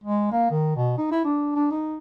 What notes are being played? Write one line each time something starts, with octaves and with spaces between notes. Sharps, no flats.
G#3
A#3
D#3
B2
D#4
E4
D4
D4
D#4